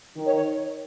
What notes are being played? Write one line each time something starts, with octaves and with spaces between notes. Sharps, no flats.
D#3
C#5
C#5